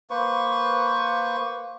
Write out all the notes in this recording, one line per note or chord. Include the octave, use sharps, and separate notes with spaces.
A#3 B4 C5 C#6